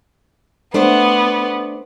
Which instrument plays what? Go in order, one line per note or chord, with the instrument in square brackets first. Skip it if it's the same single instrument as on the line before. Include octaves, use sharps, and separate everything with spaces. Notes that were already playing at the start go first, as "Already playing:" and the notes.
[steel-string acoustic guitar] A3 D4 C5 [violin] B3